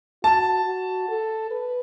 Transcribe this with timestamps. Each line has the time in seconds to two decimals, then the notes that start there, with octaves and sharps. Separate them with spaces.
0.23 F#4 A5
0.65 F#4
1.08 A4
1.51 B4